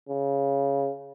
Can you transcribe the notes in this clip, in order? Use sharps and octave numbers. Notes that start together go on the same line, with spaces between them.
C#3